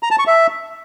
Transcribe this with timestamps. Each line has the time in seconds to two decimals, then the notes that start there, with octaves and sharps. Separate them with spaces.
0.03 A#5
0.11 A5
0.19 C#6
0.27 E5